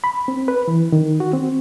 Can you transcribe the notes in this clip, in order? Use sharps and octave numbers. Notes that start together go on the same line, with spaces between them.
B5
C4
B4
E3
D#3
F#4
C4